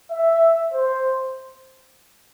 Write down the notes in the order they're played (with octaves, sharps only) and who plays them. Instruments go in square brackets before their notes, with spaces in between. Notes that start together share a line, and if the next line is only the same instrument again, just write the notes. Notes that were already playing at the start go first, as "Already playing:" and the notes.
[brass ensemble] E5
C5